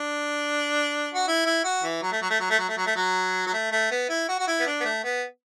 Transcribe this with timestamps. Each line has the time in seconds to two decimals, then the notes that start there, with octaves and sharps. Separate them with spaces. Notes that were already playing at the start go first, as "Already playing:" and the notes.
Already playing: D4
1.14 F#4
1.28 E4
1.46 E4
1.64 F#4
1.83 E3
2.02 F#3
2.12 A3
2.22 F#3
2.30 A3
2.40 F#3
2.50 A3
2.59 F#3
2.69 A3
2.78 F#3
2.86 A3
2.96 F#3
3.47 F#3
3.53 A3
3.72 A3
3.91 B3
4.09 E4
4.29 F#4
4.39 F#4
4.48 E4
4.59 B3
4.67 D4
4.80 B3
4.85 A3
5.04 B3